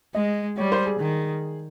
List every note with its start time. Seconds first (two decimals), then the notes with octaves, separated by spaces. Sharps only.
0.15 G#3 D#5
0.58 G3 C#5
0.72 C5
0.86 G#4
1.00 D#3